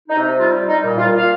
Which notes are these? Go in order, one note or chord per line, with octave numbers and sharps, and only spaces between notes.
D#4
C3
G3 F4
G3
D#4
A#2
F4
A#2
F5